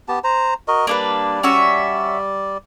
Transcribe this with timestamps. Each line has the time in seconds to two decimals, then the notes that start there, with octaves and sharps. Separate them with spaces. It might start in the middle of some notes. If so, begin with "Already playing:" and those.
0.08 B3 G4 A5
0.24 C5 A#5
0.68 F#4 A#4 D#5
0.87 G3 A#3 D4 B4 D5
1.43 C#4 F#4 E5